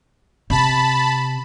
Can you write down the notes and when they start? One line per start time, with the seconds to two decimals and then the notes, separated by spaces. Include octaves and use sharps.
0.50 C3 A5 B5